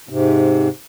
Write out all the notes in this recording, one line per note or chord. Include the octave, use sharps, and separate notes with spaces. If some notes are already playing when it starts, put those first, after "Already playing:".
G#2 C3